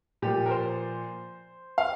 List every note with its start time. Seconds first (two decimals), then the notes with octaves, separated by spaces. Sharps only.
0.22 A#2 F3 G4
0.46 A#4
0.51 C5
1.78 F5